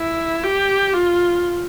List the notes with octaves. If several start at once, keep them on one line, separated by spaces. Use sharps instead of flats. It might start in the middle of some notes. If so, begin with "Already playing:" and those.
Already playing: E4
G4
F4